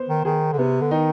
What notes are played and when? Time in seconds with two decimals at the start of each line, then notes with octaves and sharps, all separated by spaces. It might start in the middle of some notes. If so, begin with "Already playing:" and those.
Already playing: B3 C5
0.09 D#3
0.25 D#3 G#4
0.53 D3
0.58 C3 B3
0.81 D3
0.91 D#3 D#4